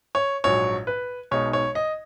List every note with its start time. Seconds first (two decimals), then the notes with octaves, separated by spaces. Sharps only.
0.15 C#5
0.44 A#1 G#2 F#3 C#5
0.87 B4
1.31 B1 B2 G#3 D#4 C#5
1.53 C#5
1.75 D#5